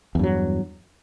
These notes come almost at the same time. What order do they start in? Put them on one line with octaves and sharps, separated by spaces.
E2 G2 F#3